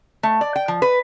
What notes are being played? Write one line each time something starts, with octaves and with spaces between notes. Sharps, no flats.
A3
D5
G5
F3
B4